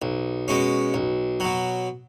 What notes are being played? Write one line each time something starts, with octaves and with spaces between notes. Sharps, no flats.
B1
B2 G#3 C#4
B1
B2 F#3